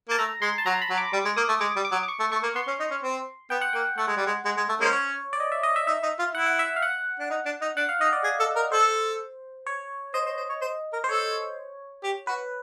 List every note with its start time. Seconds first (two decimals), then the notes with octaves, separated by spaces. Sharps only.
0.09 A#3 A5
0.19 A3 A#5
0.42 G#3 C6
0.58 A5
0.66 F#3 A#5
0.82 B5
0.90 F#3
0.98 D6
1.13 G3 D6
1.25 G#3
1.37 A#3 D#6
1.49 A3
1.61 G#3 D6
1.76 G3
1.85 D6
1.92 F#3
2.03 D6
2.08 C#6
2.20 A3
2.32 A3 C#6
2.43 A#3
2.55 B3 C6
2.68 C#4
2.80 D#4
2.91 C#4
3.03 C4
3.50 B3 G5
3.61 F#5
3.73 A#3 G5
3.98 A3 F#5
4.07 G#3
4.17 G3
4.27 G#3
4.45 G#3
4.57 G#3
4.69 A3
4.81 G#3 A#3 C#4 C5
4.93 C#5
5.33 D5
5.40 D#5
5.52 E5
5.63 D#5
5.76 E5
5.87 D#4 E5
6.03 D#4
6.19 F4
6.35 E4 F#5
6.46 F#5
6.59 E5
6.76 F5
6.82 F#5
7.19 D4
7.30 D#4
7.46 D4
7.62 D#4
7.77 D4 F#5
7.89 F5
8.01 D#4 D#5
8.13 D5
8.24 G#4
8.40 A4
8.56 A#4
8.72 A4 C5
9.66 C#5
10.14 C5 D#5
10.26 C5
10.37 C5
10.49 C#5
10.61 C5
10.93 A#4
11.04 C5
11.09 A4 C#5
12.04 G4
12.27 F#4 B4